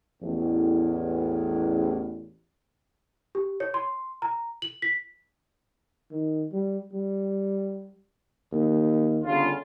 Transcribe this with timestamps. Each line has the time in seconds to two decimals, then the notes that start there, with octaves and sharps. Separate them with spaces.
0.22 A1 E2
3.35 G4
3.60 C#5
3.74 C6
4.22 A#5
4.62 F#7
4.82 B6
6.11 D#3
6.52 G3
6.93 G3
8.52 D#2
9.25 G1 C#3 F4